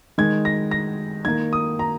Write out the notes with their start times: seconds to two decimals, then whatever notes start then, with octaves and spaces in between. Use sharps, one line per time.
0.18 D#3 G#3 G#6
0.45 A#6
0.71 A#6
1.25 D#3 A#3 G#6
1.53 D#6
1.79 A#5